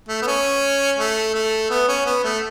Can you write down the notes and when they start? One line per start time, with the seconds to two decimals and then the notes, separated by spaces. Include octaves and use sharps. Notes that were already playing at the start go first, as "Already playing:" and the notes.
0.08 A3
0.22 B3
0.27 C#4
0.99 A3
1.34 A3
1.70 B3
1.88 C#4
2.06 B3
2.24 A3